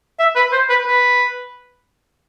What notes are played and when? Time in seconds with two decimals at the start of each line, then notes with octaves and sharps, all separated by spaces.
0.19 E5
0.36 B4
0.52 C5
0.69 B4
0.87 B4